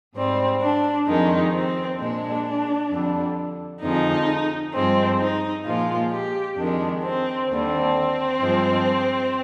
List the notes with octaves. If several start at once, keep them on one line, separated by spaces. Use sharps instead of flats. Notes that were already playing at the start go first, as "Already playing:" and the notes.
G#2 G3 C4
D4
F2 D#3 G#3 D#4
C4
A#2 G#3 D4
F2 D3 G3
F2 D3 F3 G#3 D#4
G2 F3 G#3 C4
D#4
A#2 F3 G#3 F4
G4
F2 D#3 G#3 D4
C4
D#2 D3 G3 C4
G2 F3 G#3